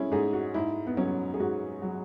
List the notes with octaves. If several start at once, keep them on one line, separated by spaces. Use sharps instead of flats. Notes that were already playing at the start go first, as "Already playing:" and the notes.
Already playing: G#3 C#4 E4 G#4
G#2 G#4
F#4
G#2 E4
B3
F#3 C#4
G#4
G#2 F#4
F#3